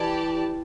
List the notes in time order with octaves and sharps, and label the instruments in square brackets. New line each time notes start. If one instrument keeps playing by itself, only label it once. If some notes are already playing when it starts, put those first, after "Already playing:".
Already playing: [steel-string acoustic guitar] E3 [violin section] G4 D5 A5